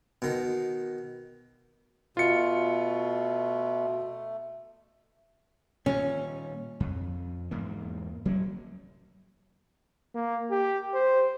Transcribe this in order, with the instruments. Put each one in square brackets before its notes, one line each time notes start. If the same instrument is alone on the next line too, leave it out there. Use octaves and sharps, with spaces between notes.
[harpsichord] B2 D#3
[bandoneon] B2 [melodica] A3 [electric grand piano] F4 C#7
[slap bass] A#2 D#3 G3 [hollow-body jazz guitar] C#4
[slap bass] F2
E2 G#2 A#3
F#3 A#3 C#4
[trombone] A#3
G4
C5